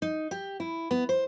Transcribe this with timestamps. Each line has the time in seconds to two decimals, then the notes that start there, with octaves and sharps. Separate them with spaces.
0.02 D#4
0.31 G4
0.60 E4
0.91 B3
1.09 C5